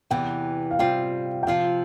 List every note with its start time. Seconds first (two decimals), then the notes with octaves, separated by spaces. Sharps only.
0.10 E2 C3 E3 B3 G5
0.71 F5
0.79 C3 G3 C4 F4 G5
1.43 G5
1.47 C3 F3 C4 F4 F5